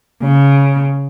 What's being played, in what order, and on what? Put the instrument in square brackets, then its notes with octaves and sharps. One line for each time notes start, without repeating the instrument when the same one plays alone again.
[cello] C#3